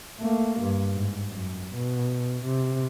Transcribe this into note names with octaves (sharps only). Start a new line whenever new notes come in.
A3 A#3
G2
G#2
F#2
B2
C3